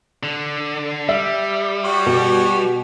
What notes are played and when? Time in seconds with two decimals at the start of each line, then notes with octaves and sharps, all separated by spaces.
0.23 D3
1.09 G3 E5
1.84 F#4 C#5 G5
2.06 B2